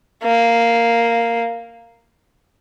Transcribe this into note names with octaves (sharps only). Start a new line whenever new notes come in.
A#3